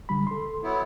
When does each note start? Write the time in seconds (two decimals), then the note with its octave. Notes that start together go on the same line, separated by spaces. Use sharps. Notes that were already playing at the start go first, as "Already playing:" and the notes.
0.09 D3 G3 B5
0.27 A4 C6
0.63 F#3 B3 E4